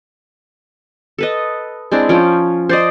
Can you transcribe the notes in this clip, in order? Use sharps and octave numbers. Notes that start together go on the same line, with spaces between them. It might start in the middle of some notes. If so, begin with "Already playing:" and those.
A4 B4 D#5
G#3 C4 D4 E4
F3 C#4 G5
C5 D5 D#5